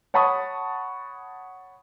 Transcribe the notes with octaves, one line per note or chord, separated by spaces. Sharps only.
C#5 F#5 A5 B5 C#6 D#6